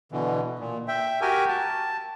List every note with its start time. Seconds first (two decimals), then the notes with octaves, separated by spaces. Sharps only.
0.12 B2 D3 E3
0.59 A#2
0.88 E5 G5
1.21 F#4 G4 A#4 G5 G#5
1.48 A5